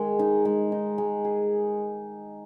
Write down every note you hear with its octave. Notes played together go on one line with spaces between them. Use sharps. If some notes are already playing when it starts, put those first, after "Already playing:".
Already playing: D#3 G#3
D#4
G#3
D#4
G#3
G#4